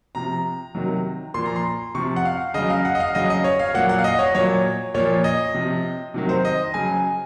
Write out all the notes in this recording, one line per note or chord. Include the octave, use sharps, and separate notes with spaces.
C3 F3 A#5
C3 D#3 F#3
A#2 F3 C6
A#5
C6
C3 F3 C#6
F#5
F5
C#3 F#3 D#5
F5
F#5
D#5
F5
C#3 F#3 D#5
D#5
C#5
F5
A#2 F#3 F#5
F#5
F5
D#5
C#5
A#2 F#3 C#5
A#2 F3 C#5
D#5
C3 F3
C3 D#3 F#3
C5
D#5
C#3 F#3 G#5